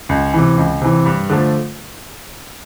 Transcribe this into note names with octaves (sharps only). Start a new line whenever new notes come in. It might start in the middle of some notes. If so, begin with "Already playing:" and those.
C#2
C3 E3
C#2
C3 E3
G2
D3 F3 A3